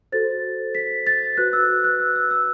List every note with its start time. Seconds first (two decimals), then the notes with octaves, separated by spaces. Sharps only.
0.12 F#4 A4 C5 A6
0.75 B6
1.07 A6
1.37 F#4 B4 F#6
1.53 E6
1.84 F#6
2.00 E6
2.16 E6
2.31 E6